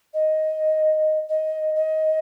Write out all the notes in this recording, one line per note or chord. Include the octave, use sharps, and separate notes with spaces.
D#5
D#5
D#5